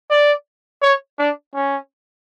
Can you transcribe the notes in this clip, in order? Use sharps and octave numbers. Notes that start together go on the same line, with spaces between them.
D5
C#5
D4
C#4